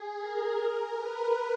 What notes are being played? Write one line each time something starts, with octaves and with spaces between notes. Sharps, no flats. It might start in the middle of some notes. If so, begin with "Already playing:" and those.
Already playing: G#4
A#4
B4